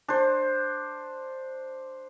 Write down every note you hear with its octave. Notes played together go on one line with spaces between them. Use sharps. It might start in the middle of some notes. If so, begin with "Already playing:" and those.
D4 C5